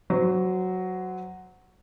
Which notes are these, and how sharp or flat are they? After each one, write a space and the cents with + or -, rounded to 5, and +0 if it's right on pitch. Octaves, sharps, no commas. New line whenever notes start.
F#3 +0 C5 -25